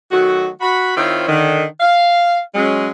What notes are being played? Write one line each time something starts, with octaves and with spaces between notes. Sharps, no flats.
D#3 F#3 A3 F#4
F#4 B5
D#3 C4 E4 F4 C5 C#5
D3 D#3
F5
F#3 G#3 C#4